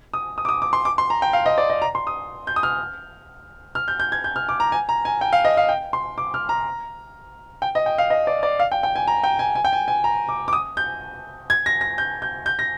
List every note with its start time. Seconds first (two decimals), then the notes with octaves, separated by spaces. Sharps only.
0.14 D#6
0.38 D#6
0.45 D6
0.49 D#6
0.62 D6
0.73 C6
0.85 D6
0.98 C6
1.10 A#5
1.22 G5
1.33 F5
1.46 D#5
1.58 D5
1.70 D#5
1.82 A#5
1.95 C6
2.07 D#6
2.47 G6
2.56 D#6
2.63 F6
3.75 F6
3.88 G6
4.00 G6
4.12 G#6
4.24 G6
4.36 F6
4.49 D6
4.60 A#5
4.72 G#5
4.89 A#5
5.05 G#5
5.21 G5
5.33 F5
5.45 D#5
5.57 F5
5.69 G5
5.93 C6
6.18 D6
6.34 F6
6.49 A#5
7.62 G5
7.75 D#5
7.86 G5
7.98 F5
8.10 D#5
8.27 D5
8.43 D5
8.60 F5
8.72 G5
8.83 G5
8.96 G#5
9.07 A#5
9.24 G5
9.39 G#5
9.55 G#5
9.65 G5
9.73 G#5
9.88 G#5
10.04 A#5
10.29 D6
10.48 D6
10.53 D#6
10.77 G6
11.50 G#6
11.66 A#6
11.81 A#6
11.98 G6
12.22 G6
12.46 G6
12.59 A#6